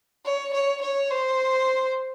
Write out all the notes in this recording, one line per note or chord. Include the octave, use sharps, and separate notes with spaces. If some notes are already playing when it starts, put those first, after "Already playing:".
C#5
C#5
C#5
C5